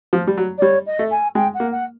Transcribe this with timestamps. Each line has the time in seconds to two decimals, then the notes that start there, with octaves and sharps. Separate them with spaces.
0.13 F3
0.27 G3
0.37 F#3
0.58 D5
0.61 G3 C#5
0.86 D#5
0.99 A3
1.11 G#5
1.35 G#3 G5
1.54 F#5
1.60 A#3
1.72 F#5